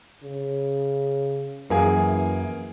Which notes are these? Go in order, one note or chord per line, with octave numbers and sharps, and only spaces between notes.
C#3
F#2 E3 A#3 G#4